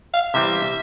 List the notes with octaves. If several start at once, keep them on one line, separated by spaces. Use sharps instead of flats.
F5
C3 E3 G3 C4 E5